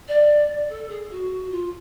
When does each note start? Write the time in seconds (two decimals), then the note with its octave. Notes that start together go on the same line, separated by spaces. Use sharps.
0.08 D5
0.69 A4
0.90 G#4
1.11 F#4
1.51 F4